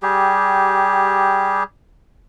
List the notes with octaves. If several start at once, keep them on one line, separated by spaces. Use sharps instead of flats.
G3 G4 G#4